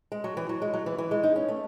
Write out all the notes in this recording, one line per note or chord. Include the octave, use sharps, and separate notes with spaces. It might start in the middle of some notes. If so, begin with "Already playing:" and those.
G#3
F#3
E3
F#3
G#3
F#3
E3
E3
G#3
D#4
C#4
A3